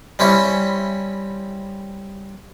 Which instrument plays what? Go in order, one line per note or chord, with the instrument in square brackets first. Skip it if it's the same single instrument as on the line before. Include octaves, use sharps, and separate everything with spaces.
[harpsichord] G3 C4 C#4 E4